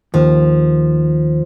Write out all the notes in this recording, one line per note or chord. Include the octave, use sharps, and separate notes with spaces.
D#2 F3